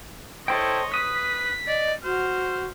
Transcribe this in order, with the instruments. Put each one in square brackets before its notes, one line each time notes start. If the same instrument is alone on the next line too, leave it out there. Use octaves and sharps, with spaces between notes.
[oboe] E4 [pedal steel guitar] A4 C5 G5 [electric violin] C#5 D#5
[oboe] B4 [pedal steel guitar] D#6 [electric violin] B6
[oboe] D5 [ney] D#5
[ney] F#4 [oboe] C5 [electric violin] F6